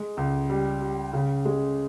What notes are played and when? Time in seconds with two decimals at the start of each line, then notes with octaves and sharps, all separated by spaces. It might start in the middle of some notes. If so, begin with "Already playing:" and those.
Already playing: G#3
0.17 C#2
0.50 G3
0.82 G3
1.13 C#3
1.45 G#3